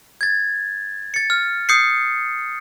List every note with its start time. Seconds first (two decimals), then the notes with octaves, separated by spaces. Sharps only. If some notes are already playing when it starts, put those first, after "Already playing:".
0.21 G#6 A6
1.14 A6 C#7
1.30 F6
1.69 D#6 G6 C7 C#7